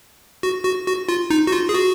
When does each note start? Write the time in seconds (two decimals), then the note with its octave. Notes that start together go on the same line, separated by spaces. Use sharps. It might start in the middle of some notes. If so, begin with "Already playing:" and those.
0.43 F#4
0.65 F#4
0.86 F#4
1.09 F4
1.30 D#4
1.47 F#4
1.52 F4
1.69 G#4
1.74 F#4